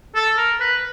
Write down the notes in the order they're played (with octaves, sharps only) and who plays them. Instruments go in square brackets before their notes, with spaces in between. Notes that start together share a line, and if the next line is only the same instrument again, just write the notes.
[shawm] A4
A#4
B4